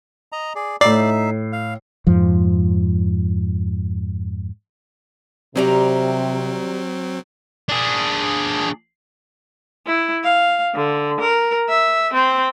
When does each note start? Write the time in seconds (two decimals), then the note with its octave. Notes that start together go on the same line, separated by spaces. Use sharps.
0.32 D#5 A#5
0.55 G#4 D5
0.81 A2 D#4 D5 E5 C7
1.53 F5
2.07 F2 G#2 F3
5.56 C3 D#3 F#3 G3 C4 A#5
7.69 D4 G#4
9.87 E4
10.24 F5
10.74 D3
11.20 A#4
11.69 E5
12.13 C4